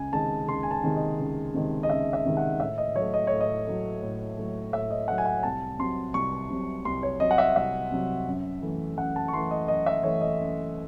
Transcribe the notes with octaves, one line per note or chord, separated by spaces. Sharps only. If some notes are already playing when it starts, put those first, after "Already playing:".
Already playing: C#2 G#5
C3 D#3 G#3 A5
C#2 C6
G#5
A5
C3 D#3 G#3
D#5
C#2
C3 D#3 G#3
D#5
C#2 E5
E5
C3 D#3 G#3
F#5
A2 E5
D#5
F#3 A3 C#5
D#5
A2 C#5
D#5
F#3 A3
A2
F#3 A3
A2 E5
D#5
F#3 A3 F#5
G#5
F#5
C2 A5
C3 F#3 C6
C2 C#6
C3 F#3
C2 C6
C#5
C3 F#3 D#5
F#5
E5
C2 E5
C3 F#3
F#2
E3 A3
F#2 F#5
A5
C#6
E3 A3 C6
D#5
F#2 D#5
E5
E3 A3 C#5
D#5
F#2